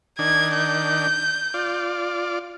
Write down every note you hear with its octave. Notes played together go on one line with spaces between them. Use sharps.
D#3 D4 G#6
G6
F4 D5